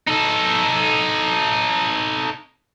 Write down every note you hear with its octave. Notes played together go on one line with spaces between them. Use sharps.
D#4 A4